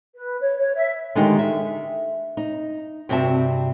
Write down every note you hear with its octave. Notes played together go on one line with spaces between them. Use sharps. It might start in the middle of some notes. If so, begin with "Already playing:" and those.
B4
C#5
C#5
E5
D3 D#3 G#3 B3 D#4 G4
E5
D#4
G2 C3 C4 F#4 E5 A5